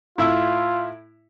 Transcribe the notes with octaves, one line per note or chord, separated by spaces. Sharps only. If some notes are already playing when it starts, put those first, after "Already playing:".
A2 E4 F4 E5